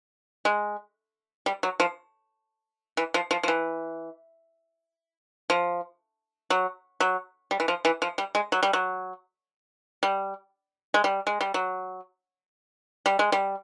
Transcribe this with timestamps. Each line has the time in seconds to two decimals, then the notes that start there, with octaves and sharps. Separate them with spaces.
0.45 G#3
1.46 G3
1.63 F#3
1.80 F3
2.97 E3
3.14 F3
3.31 F3
3.43 F3
3.48 E3
5.50 F3
6.50 F#3
7.00 F#3
7.51 G3
7.60 E3
7.68 F3
7.85 E3
8.02 F3
8.18 G3
8.35 G#3
8.52 F#3
8.63 G3
8.73 F#3
10.03 G3
10.94 G#3
11.04 G3
11.27 G#3
11.41 G3
11.54 F#3
13.06 G3
13.19 G#3
13.32 G3